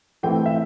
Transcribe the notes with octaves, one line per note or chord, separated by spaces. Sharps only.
E3 A3 C4 E4 G5
E5